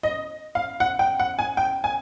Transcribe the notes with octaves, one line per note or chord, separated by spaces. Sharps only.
D#5
F5
F#5
G5
F#5
G#5
G5
G#5